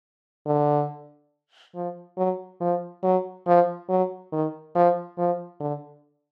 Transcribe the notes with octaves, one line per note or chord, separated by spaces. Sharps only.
D3
F3
F#3
F3
F#3
F3
F#3
D#3
F3
F3
D3